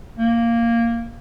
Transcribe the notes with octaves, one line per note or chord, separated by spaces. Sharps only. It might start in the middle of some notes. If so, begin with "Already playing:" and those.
A#3